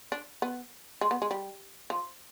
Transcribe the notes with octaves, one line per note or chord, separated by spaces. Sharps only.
D4
B3
G#3
B3
G#3
G3
F3